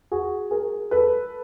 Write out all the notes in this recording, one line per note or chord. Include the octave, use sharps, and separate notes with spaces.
F#4 G#4
G#4 A#4
A4 B4